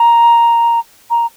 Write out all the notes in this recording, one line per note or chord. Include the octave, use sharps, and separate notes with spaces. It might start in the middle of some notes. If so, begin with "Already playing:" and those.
Already playing: A#5
A#5